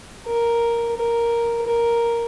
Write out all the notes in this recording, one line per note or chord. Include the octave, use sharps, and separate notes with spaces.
A#4
A#4
A#4